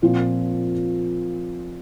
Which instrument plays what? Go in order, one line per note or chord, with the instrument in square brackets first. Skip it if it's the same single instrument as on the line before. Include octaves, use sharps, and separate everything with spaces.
[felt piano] A#2 F3 C4 F4